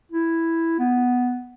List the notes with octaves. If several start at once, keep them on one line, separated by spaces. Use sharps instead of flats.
E4
B3